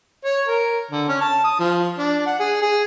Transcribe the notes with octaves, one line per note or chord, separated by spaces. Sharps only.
C#5
A#4
D3
C#4
A5
D#6
F3
D4
F#5
G#4
G#4